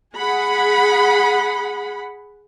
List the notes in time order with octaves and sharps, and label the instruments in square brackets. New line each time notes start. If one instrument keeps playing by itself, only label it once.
[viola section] G#4 F#5 B5